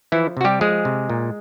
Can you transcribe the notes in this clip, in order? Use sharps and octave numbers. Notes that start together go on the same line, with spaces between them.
E3 F3 E4
C3 F#4
G3 G4
F3 G#3 G#4
C3
A#2